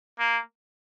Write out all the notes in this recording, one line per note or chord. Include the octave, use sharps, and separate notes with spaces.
A#3